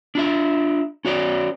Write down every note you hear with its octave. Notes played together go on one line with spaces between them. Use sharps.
D4 F4 E5
C#4 F#4 C#5 D5